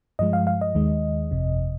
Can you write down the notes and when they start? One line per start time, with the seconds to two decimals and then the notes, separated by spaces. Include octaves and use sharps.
0.19 G2 F3 G#3 D#5
0.33 F5
0.47 F5
0.61 D#5
0.75 D#2 D#3 G#3
1.31 G1 F2 C3